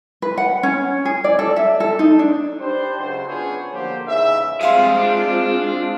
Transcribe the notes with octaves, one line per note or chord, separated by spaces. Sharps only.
B4
F#5
C#4
G#4
D5
A4
E5
A4
D#4
D4
D4 G4 B4 C5
C#2 F#3 C5
B3 C#4 D4 F4 G#4 C#5
D3 F3 F#3 A#3 G4 C5
E2 G#2 C#3 D#5 E5
G3 G#3 C4 F4 G#4 E5 F5 C6
D4